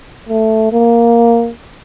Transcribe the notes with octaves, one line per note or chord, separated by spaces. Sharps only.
A3
A#3